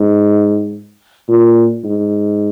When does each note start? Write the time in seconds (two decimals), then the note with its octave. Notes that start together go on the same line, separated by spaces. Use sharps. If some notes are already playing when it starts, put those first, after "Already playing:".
Already playing: G#2
1.29 A#2
1.84 G#2